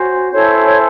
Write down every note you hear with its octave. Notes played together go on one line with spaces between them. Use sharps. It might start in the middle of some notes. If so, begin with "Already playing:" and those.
Already playing: C#4 F#4 C5
C#4 E4 A4 C5 C#5
C#5